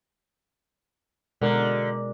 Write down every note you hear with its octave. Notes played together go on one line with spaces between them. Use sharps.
B2 D3 G#3 A#4